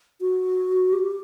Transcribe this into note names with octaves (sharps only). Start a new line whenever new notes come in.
F#4
G4